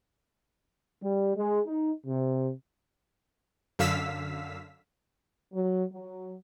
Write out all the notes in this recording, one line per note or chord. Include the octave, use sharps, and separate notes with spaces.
G3
G#3
D#4
C3
F#2 D3 F5 E6 B6
F#3
F#3